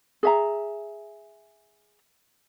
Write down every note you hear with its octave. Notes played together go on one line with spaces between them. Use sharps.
G#4 E5 A#5